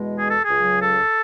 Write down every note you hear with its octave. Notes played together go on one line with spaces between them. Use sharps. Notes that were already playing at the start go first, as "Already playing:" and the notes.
Already playing: E2 B2 G#3
G#4
A4
G#4
C#2 C#3 F#3
A4